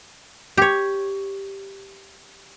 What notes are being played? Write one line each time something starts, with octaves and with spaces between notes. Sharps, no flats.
G4 C#5